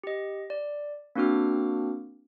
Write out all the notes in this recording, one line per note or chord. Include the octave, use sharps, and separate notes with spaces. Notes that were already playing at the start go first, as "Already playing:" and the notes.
G4 D#5
D5
A#3 C4 D4 F#4 D6 F6